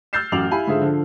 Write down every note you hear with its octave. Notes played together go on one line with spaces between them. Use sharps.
E6 F6 G6 A6 C7 E7
A1 F#2 D6 F7 F#7
E4 G4 F5 G#5 B5
G#2 D3 F4 G#4 E5
D3 F3